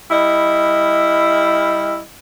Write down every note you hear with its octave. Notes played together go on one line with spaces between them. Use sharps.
G3 E4 D#5